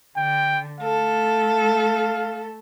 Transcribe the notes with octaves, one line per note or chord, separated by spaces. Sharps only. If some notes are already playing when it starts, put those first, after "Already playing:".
D3 G5
A3 A4 F5